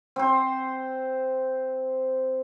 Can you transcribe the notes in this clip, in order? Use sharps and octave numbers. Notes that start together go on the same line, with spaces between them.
C4 C5